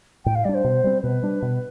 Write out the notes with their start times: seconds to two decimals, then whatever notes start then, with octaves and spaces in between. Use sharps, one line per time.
0.25 A2 G5
0.35 F5
0.45 G3 D4 D5
0.54 C5
0.64 B2
0.84 G3 C4
1.03 B2 B4
1.23 G3 D4
1.42 B2